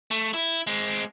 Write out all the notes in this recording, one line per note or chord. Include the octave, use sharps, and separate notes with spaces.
A3
E4
G#3 C4